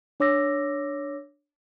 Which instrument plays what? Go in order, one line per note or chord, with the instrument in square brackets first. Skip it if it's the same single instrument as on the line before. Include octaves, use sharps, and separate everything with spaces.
[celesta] D4 C#5 D6 E6 A#6